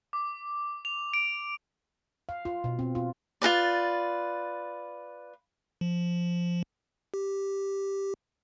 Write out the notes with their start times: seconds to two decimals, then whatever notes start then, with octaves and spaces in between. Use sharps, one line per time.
0.13 D6
0.85 F7
1.14 D7
2.29 F5
2.45 F4
2.64 B2
2.79 C4
2.95 F4
3.42 F4 F#4 B4 D5
5.81 F3
7.14 G4